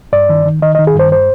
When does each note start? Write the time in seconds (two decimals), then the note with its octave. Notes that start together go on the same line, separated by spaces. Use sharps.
0.13 G2 D5
0.29 D#3
0.45 D#3
0.62 D#3 D#5
0.75 D#5
0.79 D#3
0.87 G#4
0.95 G2 C5
1.12 C5